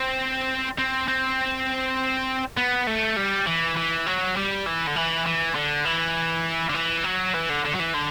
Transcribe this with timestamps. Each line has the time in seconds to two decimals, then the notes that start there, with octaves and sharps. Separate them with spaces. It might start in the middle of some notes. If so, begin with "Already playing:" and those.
Already playing: C4
0.79 C4
1.08 C4
2.57 B3
2.87 A3
3.17 G3
3.46 E3
3.76 E3
4.06 F#3
4.37 G3
4.67 E3
4.88 D3
4.96 E3
5.26 E3
5.55 D3
5.85 E3
6.70 D3
6.75 E3
7.04 F#3
7.34 E3
7.50 D3
7.65 D3
7.75 F#3
7.80 E3
7.94 D3